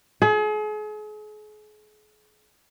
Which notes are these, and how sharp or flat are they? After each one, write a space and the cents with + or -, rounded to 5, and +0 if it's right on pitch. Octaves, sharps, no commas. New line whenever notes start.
G#4 +40